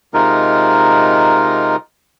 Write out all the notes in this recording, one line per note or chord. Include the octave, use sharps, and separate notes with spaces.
C3 G#3 D#4 F4 A#4